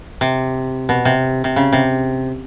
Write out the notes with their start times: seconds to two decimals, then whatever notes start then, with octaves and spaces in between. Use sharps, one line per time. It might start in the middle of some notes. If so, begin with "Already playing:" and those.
0.21 C3
0.89 B2
1.05 C3
1.44 C3
1.56 C#3
1.73 C3